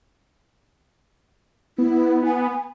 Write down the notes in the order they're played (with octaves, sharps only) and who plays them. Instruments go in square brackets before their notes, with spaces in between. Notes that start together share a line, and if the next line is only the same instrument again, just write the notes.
[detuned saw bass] B3 [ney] E4
[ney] G#5